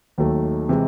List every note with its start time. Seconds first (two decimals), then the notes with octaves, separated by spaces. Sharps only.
0.18 D#2 D#3 F#3 A3
0.69 C3 E3 G#3